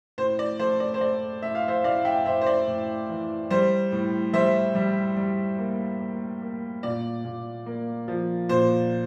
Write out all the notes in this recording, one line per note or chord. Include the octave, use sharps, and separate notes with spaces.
A2 C5
D5
A3 C5
D5
C5
A3 D5
A2 E5
F5
C5 E5
A2 D5 F5
E5 G5
A2 C5 E5
C5
D5
A2
E3
G3 C5
A2
G3 C5 E5
G3
G3
A#3
A#3
A#3
A#2 D5
A#2
A#3
F3
A#2 C5